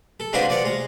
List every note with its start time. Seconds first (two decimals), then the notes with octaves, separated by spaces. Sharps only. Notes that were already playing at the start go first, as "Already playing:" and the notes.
0.20 A4
0.33 G#3 C4 D4 F4 F#4 B4
0.49 F3 D5 F#5 A#5
0.64 G#3 A#5